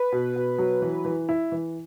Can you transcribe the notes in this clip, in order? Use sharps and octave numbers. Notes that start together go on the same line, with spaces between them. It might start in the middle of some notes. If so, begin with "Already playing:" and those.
Already playing: B4
B2
B2
F#3
E3
E3
E4
E3